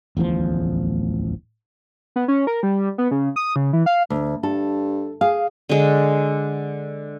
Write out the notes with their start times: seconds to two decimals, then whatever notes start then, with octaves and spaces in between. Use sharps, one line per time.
0.17 D1 A1 E2 F3
2.16 B3
2.28 C#4
2.47 A#4
2.63 G3
2.98 B3
3.11 C#3
3.36 D#6
3.56 C#3
3.73 E3
3.86 F5
4.10 D2
4.43 G2 A4
5.21 G#4 F5
5.69 D3 G#3